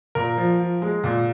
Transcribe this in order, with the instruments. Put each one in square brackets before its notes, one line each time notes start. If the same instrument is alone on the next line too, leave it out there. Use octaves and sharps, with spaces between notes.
[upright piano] A#2 [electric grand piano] A#4
[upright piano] F3
F3
G#3
A#2